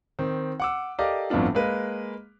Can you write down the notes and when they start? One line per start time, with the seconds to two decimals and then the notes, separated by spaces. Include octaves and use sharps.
0.19 D#3 C4
0.60 F#5 D6 E6
0.99 G4 A4 A#4 D5 D#5 F5
1.30 G1 F2 A2 B3 D4 F4
1.55 G#3 A#3 B4